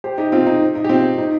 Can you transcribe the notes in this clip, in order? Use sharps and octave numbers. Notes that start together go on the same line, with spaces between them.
G4 C5
D#4 G4
C4 F4
D#4
D#4
G4
C4 F4
D#4